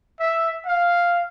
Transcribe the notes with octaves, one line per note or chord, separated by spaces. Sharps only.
E5
F5